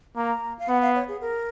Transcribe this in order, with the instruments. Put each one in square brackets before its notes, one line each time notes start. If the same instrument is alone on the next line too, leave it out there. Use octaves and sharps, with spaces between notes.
[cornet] A#3 [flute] A#5
[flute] F5
[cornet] B3 [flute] F#5
[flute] F5
C#5
G#4
A#4